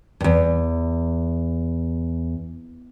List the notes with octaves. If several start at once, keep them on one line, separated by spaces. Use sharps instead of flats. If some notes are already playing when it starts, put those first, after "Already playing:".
E2 G2